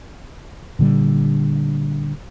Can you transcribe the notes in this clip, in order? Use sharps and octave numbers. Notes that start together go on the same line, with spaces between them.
A#2 D3 G3